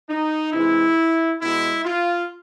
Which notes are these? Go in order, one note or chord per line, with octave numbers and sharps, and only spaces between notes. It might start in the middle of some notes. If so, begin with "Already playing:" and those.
D#4
C3 E3 G#3 E4
B2 G#3 E4
F4